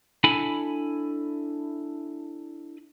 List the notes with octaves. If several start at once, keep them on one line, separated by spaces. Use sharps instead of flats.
D4 E4 A4 G#5 B5